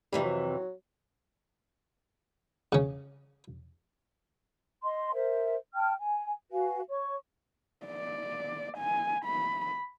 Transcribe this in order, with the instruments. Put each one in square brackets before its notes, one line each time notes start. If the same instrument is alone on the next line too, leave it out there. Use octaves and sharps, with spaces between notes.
[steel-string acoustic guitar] F2 C3 E3 [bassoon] G3
[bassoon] F#3
[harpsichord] C#3 C#4
[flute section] D#5 C6
A#4 C5 E5
G5 A5 F6
G#5
F#4 B4 F5 G#5
C#5 C#6
[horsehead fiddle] D5
G#5
B5